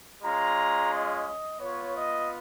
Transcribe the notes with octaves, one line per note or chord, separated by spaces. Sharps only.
G#3 C#4 F4 A#5
D#5
B3 F4 C#5
D#5